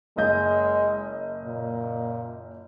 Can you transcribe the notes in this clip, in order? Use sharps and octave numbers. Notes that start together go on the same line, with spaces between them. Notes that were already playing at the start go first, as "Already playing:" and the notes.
F#1 G#3 D#5 G6
A#2